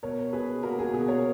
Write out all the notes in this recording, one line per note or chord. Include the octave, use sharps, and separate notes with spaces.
B2 A#4 C#5
B2 G#4 B4
A#3 F#4 A#4
G#4
B2 G#4
A#4 C#5